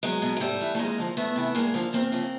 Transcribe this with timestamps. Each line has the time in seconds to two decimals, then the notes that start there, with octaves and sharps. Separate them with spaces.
0.03 E2 F#3 G#3
0.22 B2
0.37 G#3
0.41 G#2 G3 A3
0.61 E3
0.75 A3
0.79 F2 G#3 A#3
0.98 D3 F3
1.17 E2 A3 B3
1.36 C3 E3
1.55 G2 G#3 A#3
1.74 D3 F3
1.93 E2 A#3 C4
2.12 C#3 F3